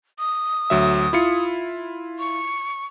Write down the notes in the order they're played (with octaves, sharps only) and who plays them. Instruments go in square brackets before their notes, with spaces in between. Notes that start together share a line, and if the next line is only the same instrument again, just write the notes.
[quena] D#6
[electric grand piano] D2 F#3 E5
E4 F4 C#7
[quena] C#6